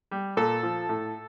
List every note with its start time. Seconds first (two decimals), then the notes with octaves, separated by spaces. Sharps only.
0.11 G3
0.37 A#2 A4
0.63 F3
0.89 A2